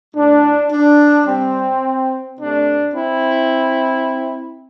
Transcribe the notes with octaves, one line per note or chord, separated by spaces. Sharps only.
A2 A3 D4
D4
C3 G3 C4
C3 A3 D4
C4 E4